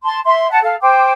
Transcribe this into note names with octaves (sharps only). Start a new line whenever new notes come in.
A5 C6
E5 C6
F#5 A5
A4 F5
C5 G5 D6